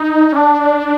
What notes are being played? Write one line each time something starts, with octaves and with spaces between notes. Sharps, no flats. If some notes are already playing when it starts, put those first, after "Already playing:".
Already playing: D#4
C#4
D4